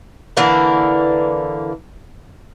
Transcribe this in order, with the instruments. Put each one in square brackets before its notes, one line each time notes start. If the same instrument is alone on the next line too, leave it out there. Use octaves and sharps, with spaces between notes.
[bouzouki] D3 E3 A#3 A#4